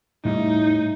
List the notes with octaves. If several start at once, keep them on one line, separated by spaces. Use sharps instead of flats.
A2 G3 D#4